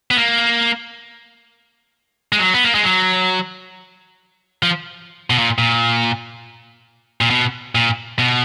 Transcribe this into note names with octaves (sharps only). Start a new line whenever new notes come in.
B3
A#3
G#3
F#3
B3
A#3
G#3
F#3
F3
B2
A#2
A#2
A#2
B2
A#2
B2